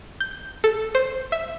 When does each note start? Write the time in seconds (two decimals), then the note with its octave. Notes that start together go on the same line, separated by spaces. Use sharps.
0.20 G6
0.64 A4
0.95 C5
1.32 E5